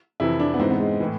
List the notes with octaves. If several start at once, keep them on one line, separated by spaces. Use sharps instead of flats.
F2 C3 E3 E4
D4
B3
G#2 E3 C4
B3
G#3
A2 E3